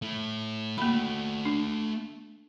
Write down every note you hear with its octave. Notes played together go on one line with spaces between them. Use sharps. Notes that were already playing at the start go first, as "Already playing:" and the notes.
A3 E4
A3 A#3 F#4 B5
D4